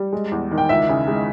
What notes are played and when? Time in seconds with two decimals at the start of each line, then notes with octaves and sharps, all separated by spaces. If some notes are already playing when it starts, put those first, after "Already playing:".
Already playing: G3
0.12 G#3
0.32 E2
0.51 D#3
0.58 G5
0.69 C#2 E5
0.89 C#3
1.08 G#3